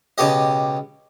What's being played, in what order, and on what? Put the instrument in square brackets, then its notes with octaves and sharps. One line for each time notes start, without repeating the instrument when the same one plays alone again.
[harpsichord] C#2 B2 G4 D#5